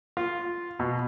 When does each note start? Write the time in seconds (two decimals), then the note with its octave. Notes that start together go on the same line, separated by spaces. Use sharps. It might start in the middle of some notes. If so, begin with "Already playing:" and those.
0.17 F4
0.79 B2